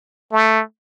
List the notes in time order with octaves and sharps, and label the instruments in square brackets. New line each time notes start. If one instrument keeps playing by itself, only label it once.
[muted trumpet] A3